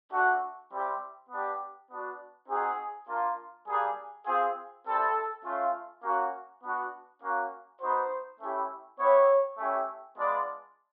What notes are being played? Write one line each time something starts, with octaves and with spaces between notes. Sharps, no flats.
A3 D4 F#4
G3 C4 E4 G4
B3 D4 G4
B3 D4 F#4
C4 D#4 F#4 G#4
A#3 D4 F4
G3 A#3 D4 G#4
C4 F4 G#4
G3 C4 E4 A4
A3 C#4 F4
A#3 C#4 F#4
B3 D4 F#4
A#3 C#4 F#4
B3 D#4 F#4 C5
A3 C#4 E4 G4
B3 E4 G4 C#5
A3 C#4 E4 G4
G#3 B3 D4 F4 D5